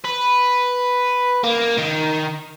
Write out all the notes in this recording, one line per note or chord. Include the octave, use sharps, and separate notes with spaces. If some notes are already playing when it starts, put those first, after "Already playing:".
B4
A#3
D#3